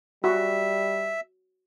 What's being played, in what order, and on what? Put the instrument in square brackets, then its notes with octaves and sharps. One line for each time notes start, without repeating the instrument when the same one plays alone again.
[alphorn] G3 [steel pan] F#4 [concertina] E5